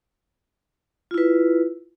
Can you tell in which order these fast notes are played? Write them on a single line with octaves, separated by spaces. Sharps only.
F4 E4 B4